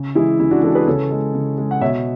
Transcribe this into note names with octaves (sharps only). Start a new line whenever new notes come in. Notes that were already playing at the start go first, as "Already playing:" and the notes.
Already playing: C#3
E3 G#3 E4 G#4
C#3 E4
D4 F#4
E3 G#3 F#4 A4
G#4 B4
C#3 A4 C#5
G#3
C#3
G#3
F#5
B2 C#5 E5